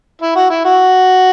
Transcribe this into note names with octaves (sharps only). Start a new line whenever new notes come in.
E4
F#4
E4
F#4